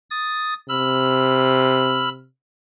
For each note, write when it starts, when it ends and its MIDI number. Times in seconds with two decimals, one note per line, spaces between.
0.10 0.54 87
0.10 0.54 93
0.69 2.26 48
0.69 2.09 83
0.69 2.09 88
0.69 2.09 89